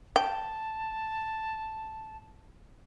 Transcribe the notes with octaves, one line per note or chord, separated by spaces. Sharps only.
G5 A5